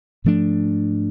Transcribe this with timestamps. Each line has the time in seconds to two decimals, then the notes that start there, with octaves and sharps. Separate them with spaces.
0.24 G#2 F3 A3 D4